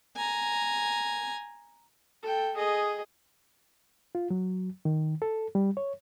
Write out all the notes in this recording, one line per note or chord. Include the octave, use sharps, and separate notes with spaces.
G#5 A#5
A4 G5
G#4 D#5
F4
F#3
D#3
A4
G3
C#5